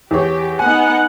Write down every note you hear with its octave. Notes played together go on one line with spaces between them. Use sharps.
E2 G4 C#5
B3 D#4 F#5 G#5